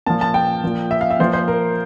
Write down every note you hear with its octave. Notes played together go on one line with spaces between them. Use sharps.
A#2 F3 A5
A5
G5
A#2 F3
E5
F5
E5
A#2 F3 C5
C5
A#4